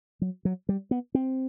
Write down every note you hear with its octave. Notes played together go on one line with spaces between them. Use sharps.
F#3
F#3
G3
B3
C4